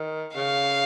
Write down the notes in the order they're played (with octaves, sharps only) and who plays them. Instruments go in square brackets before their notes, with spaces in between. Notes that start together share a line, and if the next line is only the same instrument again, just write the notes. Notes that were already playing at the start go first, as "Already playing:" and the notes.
Already playing: [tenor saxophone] D#3
[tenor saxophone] C#3 [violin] F5